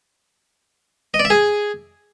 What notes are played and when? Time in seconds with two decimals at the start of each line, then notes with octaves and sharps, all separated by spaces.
1.14 D#5
1.19 D5
1.25 E5
1.30 G#4